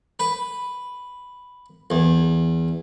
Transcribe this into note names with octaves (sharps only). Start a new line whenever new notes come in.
B4
E2